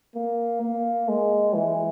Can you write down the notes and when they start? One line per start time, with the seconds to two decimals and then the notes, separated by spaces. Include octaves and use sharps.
0.15 A#3
0.61 A#3
1.08 G#3
1.54 E3